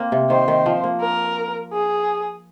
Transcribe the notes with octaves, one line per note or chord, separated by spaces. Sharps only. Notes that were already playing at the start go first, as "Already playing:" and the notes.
Already playing: A#3 C4
C3
D#3 C5
D#3
F3
A#3
A#4
G#4